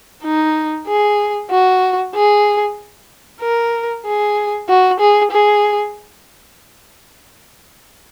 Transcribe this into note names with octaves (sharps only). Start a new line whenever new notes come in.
D#4
G#4
F#4
G#4
A#4
G#4
F#4
G#4
G#4